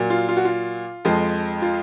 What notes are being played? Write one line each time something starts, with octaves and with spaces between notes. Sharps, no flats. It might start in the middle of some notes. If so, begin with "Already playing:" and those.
Already playing: A#2 F#3
F4
F4
F#4
F4
F2 F3 G#3
F4